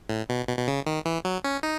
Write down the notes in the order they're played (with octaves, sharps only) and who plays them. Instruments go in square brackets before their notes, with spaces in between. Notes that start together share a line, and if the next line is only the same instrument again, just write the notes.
[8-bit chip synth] A2
B2
B2
B2
C#3
D#3
E3
F#3
C#4
D#4